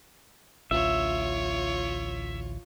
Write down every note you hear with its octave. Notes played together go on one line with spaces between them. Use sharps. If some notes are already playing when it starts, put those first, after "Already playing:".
A1 D2 F4 C#5 E5